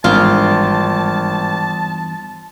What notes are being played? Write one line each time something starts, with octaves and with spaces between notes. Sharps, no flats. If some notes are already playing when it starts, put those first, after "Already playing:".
G#1 E2 G2 D4 F4 A5